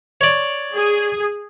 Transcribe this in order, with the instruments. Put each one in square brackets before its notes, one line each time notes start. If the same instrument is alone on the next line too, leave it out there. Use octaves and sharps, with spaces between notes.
[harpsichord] C#5 D5
[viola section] G#4